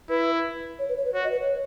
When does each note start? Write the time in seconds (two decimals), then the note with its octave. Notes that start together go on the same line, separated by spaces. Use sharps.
0.09 E4 B4
0.78 C#5
0.88 B4
0.97 C#5
1.05 B4
1.13 F#4 C#5
1.23 D#5
1.31 B4
1.40 C#5